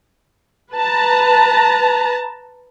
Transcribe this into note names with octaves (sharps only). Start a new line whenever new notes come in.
B4 A5 A#5